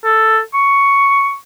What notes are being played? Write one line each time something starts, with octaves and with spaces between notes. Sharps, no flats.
A4
C#6